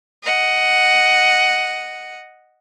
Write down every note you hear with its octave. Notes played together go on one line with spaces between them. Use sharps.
D#5 F#5